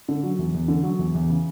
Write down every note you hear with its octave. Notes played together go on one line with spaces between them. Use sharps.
D3
F#3
E2
E2
D3
F#3
E2
E2
C#3